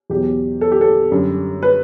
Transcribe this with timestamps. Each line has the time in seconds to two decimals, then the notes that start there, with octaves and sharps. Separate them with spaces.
0.10 E2 B2 F#3 G4
0.61 A4
0.72 G4
0.81 A4
1.11 F#2 D3 G3
1.63 B4